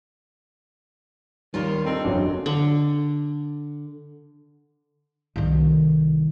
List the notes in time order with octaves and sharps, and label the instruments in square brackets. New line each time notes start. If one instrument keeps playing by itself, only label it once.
[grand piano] D#2 G3 [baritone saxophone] D#3 [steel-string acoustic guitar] F4 A#4 C#5
[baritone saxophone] C4 [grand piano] D4 D#4 A4
[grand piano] F#1 B1 E2 [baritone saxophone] C#3 [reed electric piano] F#3 D4
[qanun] D3
[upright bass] C2 D#3